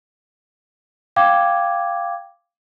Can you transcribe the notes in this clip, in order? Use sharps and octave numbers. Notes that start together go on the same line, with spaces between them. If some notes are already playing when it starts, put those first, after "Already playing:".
F5 G5 D6 G#6